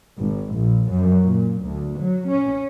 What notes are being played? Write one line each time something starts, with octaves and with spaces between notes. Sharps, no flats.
G#1
A#1
F#2
A#2
D2
F#3
C#4